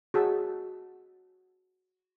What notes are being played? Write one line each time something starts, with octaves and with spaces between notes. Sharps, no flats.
F#4 G#4 A5 E6